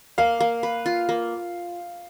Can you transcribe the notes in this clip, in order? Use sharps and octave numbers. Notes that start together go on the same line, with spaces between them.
A#3 F5
A#3
B4
F4
A#3